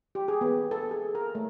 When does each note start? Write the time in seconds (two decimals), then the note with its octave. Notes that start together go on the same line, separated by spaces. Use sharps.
0.15 G4
0.28 G#4
0.41 B3
0.71 A4
0.91 G#4
1.15 A#4
1.35 A3